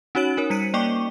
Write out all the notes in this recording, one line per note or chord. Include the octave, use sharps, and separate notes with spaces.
C#4 D#4 F#4 C#5 D7 F#7
D#4 A#4 C#5
G3 B6 C#7 D#7
A#3 D5 G5 C#6 D6 G7